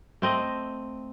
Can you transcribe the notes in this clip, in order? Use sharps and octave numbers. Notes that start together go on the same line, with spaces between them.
A3 C4 D#5